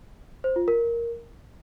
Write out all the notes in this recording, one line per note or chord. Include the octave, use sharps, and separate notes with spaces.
C5
F4
A#4